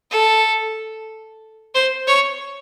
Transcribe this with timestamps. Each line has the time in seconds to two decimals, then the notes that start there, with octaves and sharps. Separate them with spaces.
0.11 A4
1.75 C5
2.07 C#5